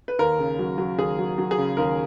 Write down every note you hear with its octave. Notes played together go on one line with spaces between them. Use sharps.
B4
D#2 A#4
C#3
F#3
F#3
D#2 G#4
F#3
F#3
G#4
C#3
D#2 A#4